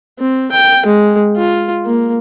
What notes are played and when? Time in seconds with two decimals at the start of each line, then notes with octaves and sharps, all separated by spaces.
0.19 C4
0.52 G5
0.86 G#3
1.36 F4
1.85 A#3